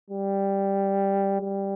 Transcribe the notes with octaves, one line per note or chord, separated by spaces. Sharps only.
G3
G3